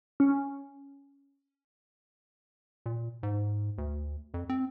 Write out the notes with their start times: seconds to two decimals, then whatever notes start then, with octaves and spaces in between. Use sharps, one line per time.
0.20 C#4
2.86 A#2
3.23 G#2
3.78 D2
4.34 F2
4.49 C4